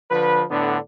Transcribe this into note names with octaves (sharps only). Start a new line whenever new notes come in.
D3 F3 B4
A2 D3 B3 D4